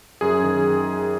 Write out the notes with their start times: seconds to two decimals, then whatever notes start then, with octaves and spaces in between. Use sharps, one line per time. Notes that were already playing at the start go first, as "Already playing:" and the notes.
0.21 F#2 G#4
0.44 D#3